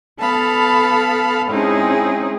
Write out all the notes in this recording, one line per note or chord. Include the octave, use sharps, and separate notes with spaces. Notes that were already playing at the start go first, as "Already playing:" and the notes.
B3 A4 F5 A5 B5
G#3 C4 C#4 D#4 E4 G#4